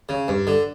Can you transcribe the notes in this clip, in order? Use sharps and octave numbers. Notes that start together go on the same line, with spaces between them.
C#3
G2
D3